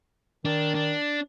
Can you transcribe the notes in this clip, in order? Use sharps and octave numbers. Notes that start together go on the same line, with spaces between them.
D#3 D4
D4